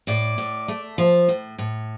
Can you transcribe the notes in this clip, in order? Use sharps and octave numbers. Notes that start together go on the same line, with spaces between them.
A2 D5
A2
A3
F3
A2
A2